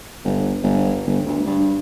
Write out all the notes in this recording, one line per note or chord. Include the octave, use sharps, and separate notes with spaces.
G1
G1
G1
D2
G2